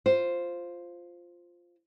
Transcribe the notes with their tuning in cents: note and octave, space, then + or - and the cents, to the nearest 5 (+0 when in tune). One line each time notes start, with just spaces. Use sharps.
F4 +0 C5 +0